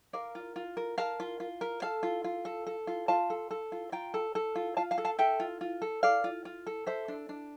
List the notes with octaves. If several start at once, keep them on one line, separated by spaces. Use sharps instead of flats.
A#4 D5 F5
F4
F4
A#4
A#4 F5 A5
F4
F4
A#4
A4 F5 A5
F4
F4
A4
A4
F4
F4 F5 A5
A4
A4
F4
F4 G5 A#5
A4
A4
F4
F4 F5 A5
F5 A5
A4
F5 A5
A4 E5 G5
F4
F4
A4
A4 D5 F5
F4
F4
A4
A4 C5 E5
D4
D4